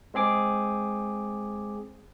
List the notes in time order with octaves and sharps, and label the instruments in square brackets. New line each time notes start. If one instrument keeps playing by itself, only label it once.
[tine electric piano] G#3 C4 G#4 D6